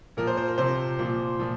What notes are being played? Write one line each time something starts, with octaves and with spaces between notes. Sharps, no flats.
A#2 F3 A#4
C5
C5
A#4
C3 F3 C5
A#2 F3
A#2 F3